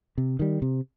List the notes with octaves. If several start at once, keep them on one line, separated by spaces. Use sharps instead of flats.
C3
D#3 G3
C3